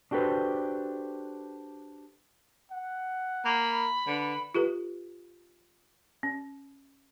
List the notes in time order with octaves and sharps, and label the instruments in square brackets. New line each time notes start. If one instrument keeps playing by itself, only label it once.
[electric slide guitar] D4 F#4 G4 A4 B4 C5
[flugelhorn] F#5
[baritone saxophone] A#3 [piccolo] B5
[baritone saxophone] D3 [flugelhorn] B4
[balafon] F4 G4 A4 B4
C#4